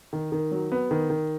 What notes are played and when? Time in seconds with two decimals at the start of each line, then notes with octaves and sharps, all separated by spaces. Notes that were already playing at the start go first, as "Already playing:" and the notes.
0.13 D#3
0.32 D#3
0.51 F#3
0.72 B3
0.91 D#3
1.10 D#3